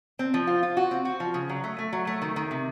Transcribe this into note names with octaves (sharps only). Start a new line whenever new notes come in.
C4
F3
F4
F4
F#4
C4
F#4
F3
C#3
F#3
A3
A3
F#3
A3
D#3
D#3
C3